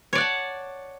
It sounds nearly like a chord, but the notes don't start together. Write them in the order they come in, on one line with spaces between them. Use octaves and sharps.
C#5 D5 F#5 A5